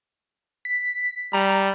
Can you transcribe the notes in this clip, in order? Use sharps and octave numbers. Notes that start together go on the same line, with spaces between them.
B6
G3 A#5